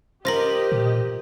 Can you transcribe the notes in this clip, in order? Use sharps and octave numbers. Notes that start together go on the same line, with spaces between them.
F4 G4 A#4 C5 D#5 A#6 F#7
A#2